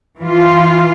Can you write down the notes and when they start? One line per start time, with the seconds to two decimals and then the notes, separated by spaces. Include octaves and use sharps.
0.20 E3 F4